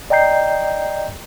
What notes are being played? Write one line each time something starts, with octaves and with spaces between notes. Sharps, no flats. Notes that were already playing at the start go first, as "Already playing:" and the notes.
D5 D#5 G5 A#5 G6 C7